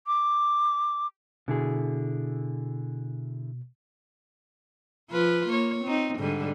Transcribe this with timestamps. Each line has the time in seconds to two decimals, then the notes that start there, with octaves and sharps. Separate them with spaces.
0.07 D6
1.48 B2 D3 E4 G#4
5.10 F3 F4 B4
5.48 A#3 C#5
5.84 C4 D#4
6.19 G#2 D3 G3